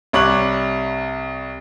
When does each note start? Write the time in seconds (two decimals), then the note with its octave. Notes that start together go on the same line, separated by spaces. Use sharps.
0.13 C2 G3 C#5 D6 F#6 F#7